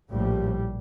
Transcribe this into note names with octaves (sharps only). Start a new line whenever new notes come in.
A#1 A2 G3